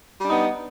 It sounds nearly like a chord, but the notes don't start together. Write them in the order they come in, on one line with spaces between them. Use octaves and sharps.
G3 D4 D#4 B3